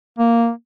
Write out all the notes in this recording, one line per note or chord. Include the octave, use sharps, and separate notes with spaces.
A#3